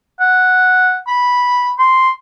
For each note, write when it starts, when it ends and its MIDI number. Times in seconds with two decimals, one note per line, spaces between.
0.20 0.97 78
1.08 1.72 83
1.79 2.11 84